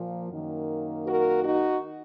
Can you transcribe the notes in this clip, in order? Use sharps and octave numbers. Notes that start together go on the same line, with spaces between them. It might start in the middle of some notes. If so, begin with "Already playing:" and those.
Already playing: A#2 F3 A#3
F#2 D#3 A#3
F#4 A#4
D#4 F#4